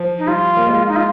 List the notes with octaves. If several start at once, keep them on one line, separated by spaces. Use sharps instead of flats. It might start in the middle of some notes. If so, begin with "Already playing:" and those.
Already playing: F3
D#4
G3 F4
A#3
G#3
D#4
F4